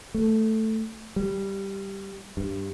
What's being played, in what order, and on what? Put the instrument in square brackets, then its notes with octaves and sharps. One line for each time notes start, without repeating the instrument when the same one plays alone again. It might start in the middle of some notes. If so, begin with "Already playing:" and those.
[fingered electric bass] A3
G3
G2